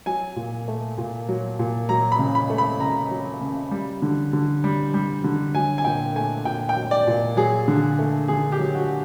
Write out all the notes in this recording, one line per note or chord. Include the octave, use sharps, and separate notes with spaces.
F#3 G#5
A#2
A3
A#2
F#3
A#2
F#3 A#5
B5
C#3
B5
A3
B5
C#3 A#5
F#3
C#3
G3
D3
D3
G3
G3
D3
F#3 G#5
G#5
A#2 G5
A3 G#5
A#2 G5
G5
F#3
D5
A#2
F#3 G#4
D3
A3
D3 G#4
G4
F#3
F#4